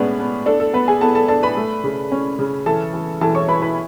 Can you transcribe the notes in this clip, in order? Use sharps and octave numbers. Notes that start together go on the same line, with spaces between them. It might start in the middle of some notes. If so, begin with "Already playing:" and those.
Already playing: A2 G#3 B3 C#4 D4 B4
B3
D4 A4
A4
B3 B4
G#4 G#5
B3 A4 A5
A4 A5
D4 A4 A5
B4 B5
A3
C#3
C#4
C#3
E3 A4 A5
E3
E3 A4 A5
C#5 C#6
E4 B4 B5
B4 B5